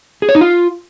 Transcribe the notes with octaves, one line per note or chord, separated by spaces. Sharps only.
G#4
C#5
D#4
F4